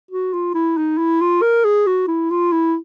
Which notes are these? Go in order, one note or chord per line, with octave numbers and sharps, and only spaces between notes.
F#4
F4
E4
D#4
E4
F4
A#4
G#4
F#4
E4
F4
E4